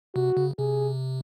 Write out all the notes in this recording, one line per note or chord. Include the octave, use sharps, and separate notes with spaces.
C3 F#4
C#3
C3 G#4